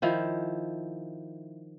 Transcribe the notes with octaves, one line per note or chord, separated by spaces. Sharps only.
D#3 F3 E4